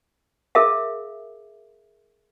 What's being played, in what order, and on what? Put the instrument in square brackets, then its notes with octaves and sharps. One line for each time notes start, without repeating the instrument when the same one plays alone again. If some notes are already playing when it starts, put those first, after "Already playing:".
[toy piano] G#4 A#4 E5 F5